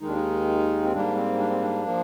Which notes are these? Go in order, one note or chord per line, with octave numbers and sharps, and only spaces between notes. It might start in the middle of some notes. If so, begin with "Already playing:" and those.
D#2 D#3 G#3 D#4
D4
D#4
C4
G#2 G3 A#3 D4
C4
D4
C4
D4
F3 A#3